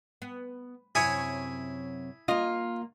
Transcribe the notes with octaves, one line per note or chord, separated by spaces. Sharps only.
B3
F#2 C3 E4 G#4 C#5 G#5
A#3 F4 D#5